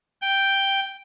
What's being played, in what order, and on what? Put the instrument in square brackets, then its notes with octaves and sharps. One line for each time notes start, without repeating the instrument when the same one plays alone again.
[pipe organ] G5